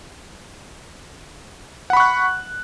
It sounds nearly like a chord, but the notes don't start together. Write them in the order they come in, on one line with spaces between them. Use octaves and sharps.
F#5 B5 C#6 F#6